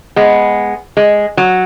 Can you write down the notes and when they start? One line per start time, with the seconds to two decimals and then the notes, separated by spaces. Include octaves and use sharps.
0.16 G#3 B3
0.97 G#3
1.37 F#3